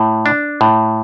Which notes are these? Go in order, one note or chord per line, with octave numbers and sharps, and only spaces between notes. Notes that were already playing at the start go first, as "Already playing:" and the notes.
Already playing: A2
D4
A2